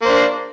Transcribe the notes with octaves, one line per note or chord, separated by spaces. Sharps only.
A#3 D4 C5